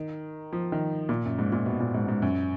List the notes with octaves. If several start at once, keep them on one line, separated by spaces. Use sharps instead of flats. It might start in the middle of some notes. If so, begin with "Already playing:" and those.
Already playing: D#3
F3
D#3
A#2
F#2
G#2
A#2
B2
A#2
G#2
G#2
F#2